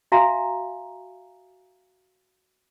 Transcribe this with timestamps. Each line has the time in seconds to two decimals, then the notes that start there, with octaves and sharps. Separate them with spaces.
0.12 F#4 E5 F5 G#5 A#5